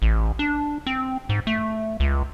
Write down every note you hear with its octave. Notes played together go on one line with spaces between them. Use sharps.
A1
D4
C4
G#2
A3
C#2